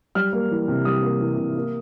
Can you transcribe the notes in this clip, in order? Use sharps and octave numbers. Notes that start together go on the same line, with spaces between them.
G3 F6
A#3
E3
C3
G3 D#6
A#3
E3
C3
A#3